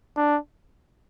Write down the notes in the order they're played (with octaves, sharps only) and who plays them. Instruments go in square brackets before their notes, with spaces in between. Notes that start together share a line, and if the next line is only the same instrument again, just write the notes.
[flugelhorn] D4